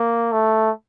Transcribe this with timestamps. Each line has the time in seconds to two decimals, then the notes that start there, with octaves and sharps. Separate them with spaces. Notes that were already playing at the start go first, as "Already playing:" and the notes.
Already playing: A#3
0.32 A3